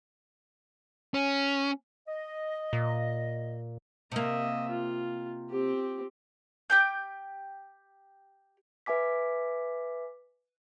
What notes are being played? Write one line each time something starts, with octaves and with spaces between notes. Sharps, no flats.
C#4
D#5
A#2
C3 A#3 D#5 E5
F4
C4 G4
G4 G5 G6
B4 E5 G#5 D6 B6